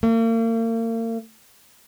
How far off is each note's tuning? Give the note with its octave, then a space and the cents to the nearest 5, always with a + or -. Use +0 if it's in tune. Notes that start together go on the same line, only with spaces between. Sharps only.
A#3 -40